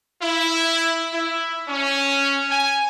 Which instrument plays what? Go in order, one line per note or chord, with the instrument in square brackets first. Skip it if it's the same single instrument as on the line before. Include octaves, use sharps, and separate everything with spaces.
[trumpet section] E4
E4
C#4
G#5